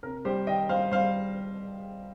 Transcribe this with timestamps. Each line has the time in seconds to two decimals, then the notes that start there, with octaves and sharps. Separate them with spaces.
0.03 C3 A#4
0.25 G3 G4 C5
0.47 D#3 D#5 G5
0.69 G3 C5 F5
0.91 G3 C5 F5